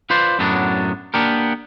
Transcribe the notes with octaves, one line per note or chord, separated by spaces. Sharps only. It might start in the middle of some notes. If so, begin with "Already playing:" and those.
F4 B4 C5 D5
F#2 A2 F#3 B3 D4
A#3 B3 D4 G4 A#4